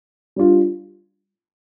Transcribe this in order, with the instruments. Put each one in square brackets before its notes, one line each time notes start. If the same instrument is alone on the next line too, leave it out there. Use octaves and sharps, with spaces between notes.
[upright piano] G3 D4 F4